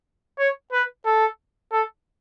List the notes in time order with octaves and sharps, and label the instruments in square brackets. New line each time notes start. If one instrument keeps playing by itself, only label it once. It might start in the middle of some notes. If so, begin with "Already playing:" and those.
[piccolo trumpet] C#5
B4
A4
A4